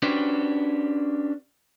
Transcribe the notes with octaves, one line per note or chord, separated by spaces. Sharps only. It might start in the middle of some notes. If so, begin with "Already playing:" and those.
C#4 D4 F#4 G4 B4 C5